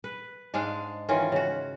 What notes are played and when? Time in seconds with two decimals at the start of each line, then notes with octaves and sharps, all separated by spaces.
0.04 B4
0.54 G#2 G#3 D4 F5
1.09 D#3 E3 C#4 F4
1.32 C#3 F#4